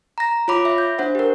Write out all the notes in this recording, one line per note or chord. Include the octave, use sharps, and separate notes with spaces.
A#5 A#6
F4 C#5 B5 D6
E5
G6
D4 C5 F#5
G4 A#4